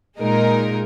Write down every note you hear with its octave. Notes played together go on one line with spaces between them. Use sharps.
A#2 G#3 D#4 A#4